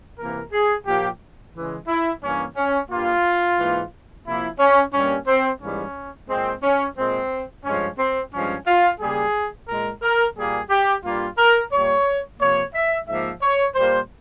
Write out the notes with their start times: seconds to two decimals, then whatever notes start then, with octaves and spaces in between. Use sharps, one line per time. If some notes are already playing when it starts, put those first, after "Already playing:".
0.19 C3 E3 A#3 A#4
0.53 G#4
0.86 A#2 F3 A#3 G4
1.55 C#3 E3 G#3
1.88 E4
2.22 G2 E3 A#3 C#4
2.57 C#4
2.90 G2 G3 A#3 F4
3.59 G#2 E3 A#3
4.26 C3 F3 A#3 E4
4.59 C#4
4.94 G2 G3 A#3 C#4
5.28 C4
5.61 G#2 E3 G3 A#3 C#4
6.29 A#2 G#3 C4
6.63 C#4
6.97 A#2 G#3 C4
7.65 G2 F3 G#3 C#4
7.99 C4
8.33 G2 F3 G#3 C#4
8.67 F4
9.00 C#3 G3 A#3 G#4
9.68 A#2 G#3 A#4
10.03 A#4
10.37 A#2 G3 A#3 G#4
10.70 G4
11.04 G2 G3 A#3 F4
11.38 A#4
11.72 A#2 G3 A#3 C#5
12.40 C3 F3 A#3 C#5
12.75 E5
13.08 G#2 F3 A#3 E5
13.42 C#5
13.76 A#2 G3 A#3 C5